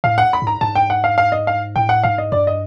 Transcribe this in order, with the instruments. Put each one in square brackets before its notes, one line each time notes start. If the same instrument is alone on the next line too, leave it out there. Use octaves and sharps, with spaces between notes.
[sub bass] A2 [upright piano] F5
[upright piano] F#5
B5
[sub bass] G#2
[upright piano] A#5
[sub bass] G#2 [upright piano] A5
[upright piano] G5
F#5
F5
F5
D#5
F5
[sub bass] A2 [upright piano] G5
[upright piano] F#5
[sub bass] G#2 [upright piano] F5
[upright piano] D#5
[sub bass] G2 [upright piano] D5
[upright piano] D#5